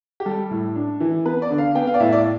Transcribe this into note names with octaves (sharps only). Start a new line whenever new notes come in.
G4
G3 A4
A2
D4
E3
B3 B4
D5
D3
F5
B3 G5
F5
D5
A2 E5
D5